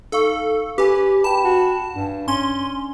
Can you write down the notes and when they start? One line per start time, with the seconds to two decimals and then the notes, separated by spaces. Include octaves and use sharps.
0.12 D#4 A4 F5 C#6
0.78 C#4 G4 B4 G#5
1.24 G5 A5 B5
1.44 F#4
1.96 G2 D4
2.28 C#4 C6